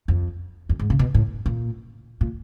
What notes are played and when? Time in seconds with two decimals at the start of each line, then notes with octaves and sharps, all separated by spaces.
0.08 F2
0.69 F2
0.79 G#2
0.90 C#3
0.99 B2
1.14 A2
1.46 A#2
2.21 A#2